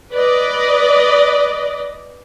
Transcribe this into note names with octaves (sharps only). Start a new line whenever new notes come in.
B4 D5 D#5